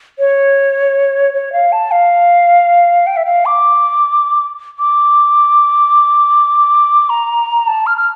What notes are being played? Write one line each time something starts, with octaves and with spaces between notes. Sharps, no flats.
C#5
C#5
F5
A5
F5
G5
E5
F5
D6
D6
A#5
A5
F6
F6